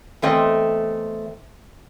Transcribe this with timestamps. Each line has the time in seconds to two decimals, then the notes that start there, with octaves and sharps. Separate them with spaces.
0.22 E2 A3 C4 D#5